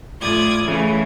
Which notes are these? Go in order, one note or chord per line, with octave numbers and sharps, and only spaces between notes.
A2 F4 D5 D#6 G#6
C#3 E3 A3